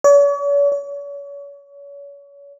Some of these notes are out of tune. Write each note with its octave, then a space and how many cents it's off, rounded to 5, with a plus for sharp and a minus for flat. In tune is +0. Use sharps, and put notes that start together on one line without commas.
C#5 +45
C#5 +35